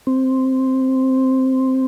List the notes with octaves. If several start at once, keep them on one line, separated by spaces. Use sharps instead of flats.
C4